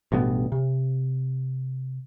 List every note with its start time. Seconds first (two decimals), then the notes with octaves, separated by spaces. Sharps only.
0.12 A1 G2 B2 B3
0.52 C3